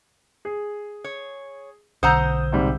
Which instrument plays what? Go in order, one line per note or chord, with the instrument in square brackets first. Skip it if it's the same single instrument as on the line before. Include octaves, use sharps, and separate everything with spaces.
[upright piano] G#4
[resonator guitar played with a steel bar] C#5
[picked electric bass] B1 D3 [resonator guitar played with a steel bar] C5 F#5 A#5 [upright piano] D#6 E6 G6
[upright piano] G#2 C3 G3